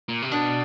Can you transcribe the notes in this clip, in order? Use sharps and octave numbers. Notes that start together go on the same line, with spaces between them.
A#2
C3
B2 D4